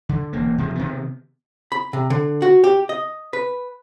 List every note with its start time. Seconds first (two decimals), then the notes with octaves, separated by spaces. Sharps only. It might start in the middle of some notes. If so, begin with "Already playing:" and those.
0.09 D3
0.33 E1 A#3
0.58 C3 F3 G#3
0.75 C3 D#3 B3
1.72 B5
1.93 C3
2.10 D3
2.42 F#4
2.64 G4
2.89 D#5
3.33 B4